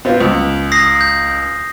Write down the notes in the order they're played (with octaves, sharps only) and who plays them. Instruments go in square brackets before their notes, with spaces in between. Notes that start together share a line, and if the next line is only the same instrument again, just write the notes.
[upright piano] B3 C4 F4
C#2
[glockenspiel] D#6 A#6 C7
G6